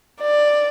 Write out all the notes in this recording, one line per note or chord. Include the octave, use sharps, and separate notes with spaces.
D5